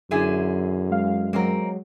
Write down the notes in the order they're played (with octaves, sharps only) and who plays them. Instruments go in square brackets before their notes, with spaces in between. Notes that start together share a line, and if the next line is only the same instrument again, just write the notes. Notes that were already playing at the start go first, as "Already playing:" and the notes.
[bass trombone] F#2 [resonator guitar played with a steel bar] D3 E4 G#4
[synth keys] G#3 F5
[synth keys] F#3 G#3 [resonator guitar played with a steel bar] A#3 C4 A#4